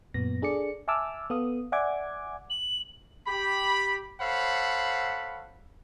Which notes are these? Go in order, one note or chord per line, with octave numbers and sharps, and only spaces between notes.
F#2 A#2 B3 A#6
D4 G#4 A4 D5 C#7
E5 G#5 A5 D6 E6 F6
B3 A4 F5 D#6
D5 E5 F#5 G#5 D6 G#6
F#7
G4 B5
A4 C5 C#5 F5 F#5 B5